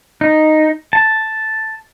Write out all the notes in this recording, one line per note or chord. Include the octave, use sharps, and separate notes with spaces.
D#4
A5